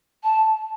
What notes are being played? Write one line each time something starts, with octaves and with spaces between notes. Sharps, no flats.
A5